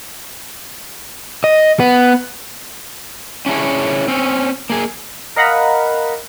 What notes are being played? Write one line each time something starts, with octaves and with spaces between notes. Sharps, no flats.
D#5
B3
C#4 D4 E4 G#4 C#5
C4 C#4
A#3 G#4
A#4 D#5 F5 F#5 A#5 B5